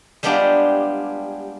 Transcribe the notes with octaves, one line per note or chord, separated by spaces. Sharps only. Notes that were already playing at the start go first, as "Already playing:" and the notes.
G3 G#3 B3 D4 F4 G4